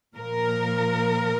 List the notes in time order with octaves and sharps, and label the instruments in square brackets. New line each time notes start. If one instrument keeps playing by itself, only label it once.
[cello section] A#2 F3 A#4